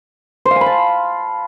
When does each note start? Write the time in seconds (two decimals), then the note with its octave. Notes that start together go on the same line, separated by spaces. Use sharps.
0.45 C5
0.51 F5
0.56 G#5
0.61 B5
0.66 A5